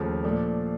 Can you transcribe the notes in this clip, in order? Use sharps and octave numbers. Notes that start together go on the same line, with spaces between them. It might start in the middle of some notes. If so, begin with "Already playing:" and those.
Already playing: D#2 C#3 F3 A3
A#2 F3 A3 D4